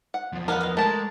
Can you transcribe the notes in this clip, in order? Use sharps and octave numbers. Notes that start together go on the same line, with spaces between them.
F#5
E2 F3
A#4 B4 D#5 F5 F#5
D#5 F5
G#3 A3 A#4 D5 A5